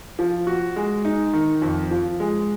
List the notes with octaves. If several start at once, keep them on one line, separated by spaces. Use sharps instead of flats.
F3
F#4
G#3
D#4
D#3
F2
F3
G#3